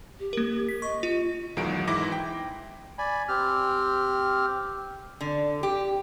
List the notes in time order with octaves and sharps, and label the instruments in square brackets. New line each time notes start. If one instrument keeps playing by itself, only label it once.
[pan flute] G4
[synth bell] A#3 A#4
B6
[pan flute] D#5 [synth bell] C#6
[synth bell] F4
[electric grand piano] B1 E2 D#3 F#3 G#3 D7
G#2 E3 E4 D6 A#6
G5
[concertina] D5 G#5 B5
C4 G4 F6
[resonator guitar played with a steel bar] D3
G4